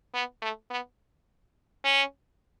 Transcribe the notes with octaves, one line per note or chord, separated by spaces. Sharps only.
B3
A3
B3
C#4